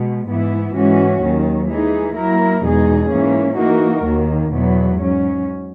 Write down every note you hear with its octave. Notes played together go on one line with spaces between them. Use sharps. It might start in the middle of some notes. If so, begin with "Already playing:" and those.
Already playing: B2 G#3
G#2 E3 B3 E4
G#2 E3 G#3 C#4 F#4
D#2 D#3 F#3
E3 G#3 D#4 G#4
F#3 A#3 E4 A#4
E2 B2 G#3 D#4 G#4
G#2 E3 A#3 C#4
E3 A#3 D#4 F#4 A#4
D#2 D#3 A#3
E2 B2 F#3 B3
G#2 F#3 C#4